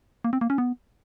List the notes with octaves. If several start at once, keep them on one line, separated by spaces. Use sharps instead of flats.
A#3
C4
A#3
C#4
B3